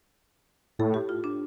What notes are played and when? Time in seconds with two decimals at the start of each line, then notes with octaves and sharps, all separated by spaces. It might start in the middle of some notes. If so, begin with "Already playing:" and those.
0.79 A2 A4
0.94 G4
1.09 F4
1.24 D4